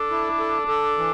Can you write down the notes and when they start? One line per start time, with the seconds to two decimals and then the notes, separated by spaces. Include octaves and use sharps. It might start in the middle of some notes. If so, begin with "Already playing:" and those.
Already playing: D4 A4
0.10 E4
0.39 A4
0.68 A4
0.98 E3